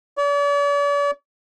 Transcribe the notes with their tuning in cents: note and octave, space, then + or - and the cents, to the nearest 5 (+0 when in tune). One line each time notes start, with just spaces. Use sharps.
D5 -45